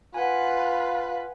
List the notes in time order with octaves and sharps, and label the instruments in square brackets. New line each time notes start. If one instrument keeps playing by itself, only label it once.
[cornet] F4 [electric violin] B4 [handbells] F#5 G#5